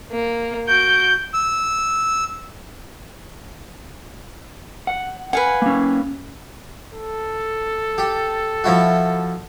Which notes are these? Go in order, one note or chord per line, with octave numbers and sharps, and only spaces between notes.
A#3
F#4 G6 D7
E6
F#5
B4 F5 F#5 G#5
A#3 C#4
A4
G4
F3 E4 F#4